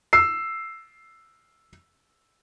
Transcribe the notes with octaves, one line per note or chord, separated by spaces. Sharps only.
E6 C7